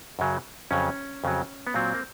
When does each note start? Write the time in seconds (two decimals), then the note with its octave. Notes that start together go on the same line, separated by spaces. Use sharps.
0.19 F#2 C#3 F#3
0.71 F2 C#3 F#3 C#4
1.24 F2 C#3 F#3
1.67 B3
1.74 A#2 F#3 C4
1.94 A#3